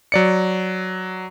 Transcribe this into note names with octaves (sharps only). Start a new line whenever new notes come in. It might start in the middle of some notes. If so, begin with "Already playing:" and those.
F#3 D5 C#7